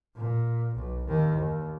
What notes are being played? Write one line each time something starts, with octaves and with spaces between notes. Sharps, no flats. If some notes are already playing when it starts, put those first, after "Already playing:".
A#2
B1
D#2 D#3
D#2